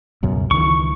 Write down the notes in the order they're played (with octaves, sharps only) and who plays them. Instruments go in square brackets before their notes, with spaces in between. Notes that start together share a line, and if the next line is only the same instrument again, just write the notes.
[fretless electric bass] C#2 F#2 B2
[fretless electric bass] C#2 D#3 E3 [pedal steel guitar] C#6